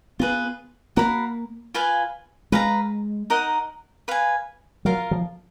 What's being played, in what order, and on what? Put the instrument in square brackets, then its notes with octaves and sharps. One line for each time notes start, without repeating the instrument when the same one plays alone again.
[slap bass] B3 [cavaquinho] F4 G#4 B4
[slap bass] A#3 [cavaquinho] F#4 A#4 F5 B5
[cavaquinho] F4 B4 F5 G#5
[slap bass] G#3 [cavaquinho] B4 F5 A#5
[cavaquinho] D#4 A#4 D#5 F#5
B4 F5 G#5
[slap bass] F#3 [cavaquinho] F4 A#4 F5
[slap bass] F3